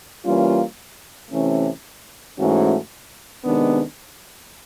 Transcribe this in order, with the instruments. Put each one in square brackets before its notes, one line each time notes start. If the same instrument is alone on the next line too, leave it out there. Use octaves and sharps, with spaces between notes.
[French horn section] E3 G3 A#3 C#4 F4
C3 E3 A3 C#4
G#2 E3 A3 C#4 F#4
C3 D#3 G#3 B3 D4